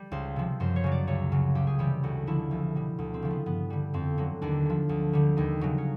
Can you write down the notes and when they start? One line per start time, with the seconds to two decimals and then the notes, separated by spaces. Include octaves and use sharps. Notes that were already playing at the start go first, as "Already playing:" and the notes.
Already playing: G3
0.12 C#2 C5
0.36 C3 F3
0.60 F#2 C5
0.76 C#5
0.84 C#3 F#3
0.92 D5
1.07 C#2 C#5
1.32 C#3 F#3
1.55 C#2 G4
1.67 G#4
1.79 C3 E3 G3 G4
2.03 D2 F#4
2.27 D3 F3 E4
2.51 C2
2.75 B2 G3
2.99 D2
3.14 C4
3.22 C#3 F3
3.31 B3
3.46 G2 B3
3.70 D3 G3
3.94 F2 C4
4.18 D3 F#3
4.42 D#2 D4
4.65 D3 F3
4.89 D2
5.13 D3 G3
5.37 D#2 D#4
5.61 C#3 F#3
5.78 C#4